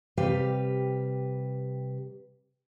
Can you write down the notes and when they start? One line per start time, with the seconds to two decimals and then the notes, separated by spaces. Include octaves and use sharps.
0.17 C3 G3 G4 B4 F5